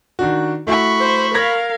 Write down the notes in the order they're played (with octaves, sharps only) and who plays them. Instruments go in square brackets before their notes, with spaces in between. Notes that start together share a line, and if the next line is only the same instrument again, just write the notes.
[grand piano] D#3 D4 F#4
[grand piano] A3 E4 F#4 [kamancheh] B5 C#6
[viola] C5
[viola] A#4 F5 [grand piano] G#6 A#6 B6